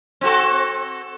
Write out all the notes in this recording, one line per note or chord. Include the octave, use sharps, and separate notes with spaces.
C4 F#4 A4